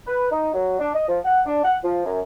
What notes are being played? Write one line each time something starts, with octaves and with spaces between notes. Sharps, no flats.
B4
D#4
F#3
D4
D#5
F3
F#5
D4
F#5
F3
F#2